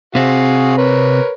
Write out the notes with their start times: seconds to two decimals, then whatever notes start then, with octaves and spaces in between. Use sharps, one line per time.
0.15 C3 C4 F#4 G#4 F5
0.78 A#4 B4 C#5